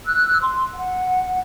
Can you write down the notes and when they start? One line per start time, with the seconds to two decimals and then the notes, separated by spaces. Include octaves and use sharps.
0.07 E6 F#6
0.41 C6
0.75 F#5